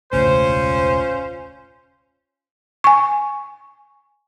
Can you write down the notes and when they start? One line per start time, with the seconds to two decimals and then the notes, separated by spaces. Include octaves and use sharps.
0.13 E1 C#2 A2 C#4 F4 C5
2.84 G#5 C#6